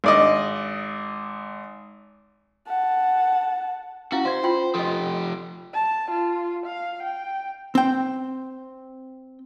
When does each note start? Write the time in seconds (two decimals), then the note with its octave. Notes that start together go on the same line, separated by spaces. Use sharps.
0.04 G#1 D5 D#5
2.67 F#5 A5
4.12 C#4 E4 F#4 F5
4.25 C5 D5 F5
4.43 F4 G5 C6
4.75 F3 G4 A4 D#5
5.74 A5
6.11 F4
6.66 F5
7.03 G5
7.75 C4 G5